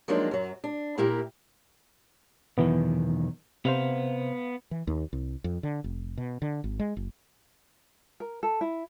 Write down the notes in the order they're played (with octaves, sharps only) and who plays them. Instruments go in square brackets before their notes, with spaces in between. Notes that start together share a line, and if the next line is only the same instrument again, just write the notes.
[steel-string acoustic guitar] F3 F#3 G#3 A#3 D4 D#4
F#2 F#3
D4
A#2 A#3 E4 G4 A#4
[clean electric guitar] B1 E2 D#3 [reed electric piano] E3 B3
[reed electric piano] C3 C5 [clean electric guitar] B3 F5
[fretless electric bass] E3
D#2
C2
F2
D3
F1
B2
D3
G#1
G#3
F#1
[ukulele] A#4
A4
E4